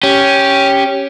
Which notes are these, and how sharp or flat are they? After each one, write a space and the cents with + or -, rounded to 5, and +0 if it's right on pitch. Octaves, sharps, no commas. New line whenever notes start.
C#4 +0 G4 +0